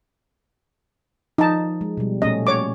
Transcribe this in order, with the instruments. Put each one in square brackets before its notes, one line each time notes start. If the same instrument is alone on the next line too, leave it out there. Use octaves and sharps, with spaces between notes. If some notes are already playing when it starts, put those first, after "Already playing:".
[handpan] F3 [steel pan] D#4 A5
[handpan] G#3
B2 G3
[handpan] A#2 A3 C#4 [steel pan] D#5
[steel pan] C#5 D6